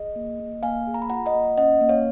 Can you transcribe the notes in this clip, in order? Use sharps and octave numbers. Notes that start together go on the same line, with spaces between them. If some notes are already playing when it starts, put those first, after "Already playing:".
Already playing: G#4 D#5
A#3
A#3
A#3 F5 G#5
G#4
A#5
B5
F4 F#5 A#5
D#5 F#5
A#3
C#4 D#5 F#5
A#3
C#5 F5